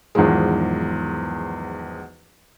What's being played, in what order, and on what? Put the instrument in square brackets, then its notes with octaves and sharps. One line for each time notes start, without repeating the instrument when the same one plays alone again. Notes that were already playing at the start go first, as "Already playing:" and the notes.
[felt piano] B1 E2 G#2 D#3 F3 G#3